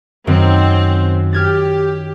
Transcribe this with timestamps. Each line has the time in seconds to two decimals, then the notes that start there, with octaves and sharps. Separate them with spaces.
0.27 F#2 D#3 C4
1.33 G4 F6 G#6 A6